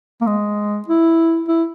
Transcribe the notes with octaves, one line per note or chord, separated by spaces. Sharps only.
A#3
G#3
E4
E4